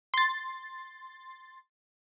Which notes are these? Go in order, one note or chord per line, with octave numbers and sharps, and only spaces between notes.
C6 A6